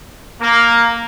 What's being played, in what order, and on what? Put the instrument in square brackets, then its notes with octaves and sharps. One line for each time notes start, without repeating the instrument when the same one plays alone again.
[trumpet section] A#3